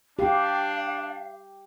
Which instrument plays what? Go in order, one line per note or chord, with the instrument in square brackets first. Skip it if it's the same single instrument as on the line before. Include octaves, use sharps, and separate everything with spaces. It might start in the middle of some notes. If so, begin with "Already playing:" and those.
[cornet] D4 [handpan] G4 [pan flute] F5